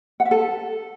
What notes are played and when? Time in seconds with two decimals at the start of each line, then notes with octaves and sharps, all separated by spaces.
0.20 F#5
0.25 E5
0.31 A4